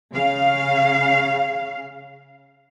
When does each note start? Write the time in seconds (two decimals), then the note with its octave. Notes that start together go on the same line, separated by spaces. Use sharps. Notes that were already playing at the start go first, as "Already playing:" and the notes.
0.13 C#3 F5